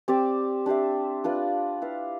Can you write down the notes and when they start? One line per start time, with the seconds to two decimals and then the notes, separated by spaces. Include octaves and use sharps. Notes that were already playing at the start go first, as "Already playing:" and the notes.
0.08 C4 G4 D5
0.66 D4 G4 C5 E5
1.24 D4 F4 B4 D5
1.81 E4 B4 F5